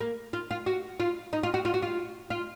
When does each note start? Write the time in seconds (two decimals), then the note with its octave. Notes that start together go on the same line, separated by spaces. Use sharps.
0.01 A#3
0.33 F4
0.51 F4
0.66 F#4
1.00 F4
1.33 D#4
1.43 F4
1.54 F#4
1.65 F4
1.74 F#4
1.82 F4
2.30 F4